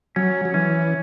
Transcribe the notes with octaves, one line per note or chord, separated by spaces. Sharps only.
F#3 C#4
F#3
E3 C#4